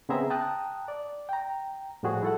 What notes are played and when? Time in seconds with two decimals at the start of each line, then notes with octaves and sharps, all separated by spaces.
0.09 C#3 B3 C4 G#4 E5 A#5
0.30 G5 A5 A#5 D#6 F#6
0.88 D5
1.29 G5 A#5
2.03 A2 F3 G3 F#4 G#4
2.23 E4 A4 F#5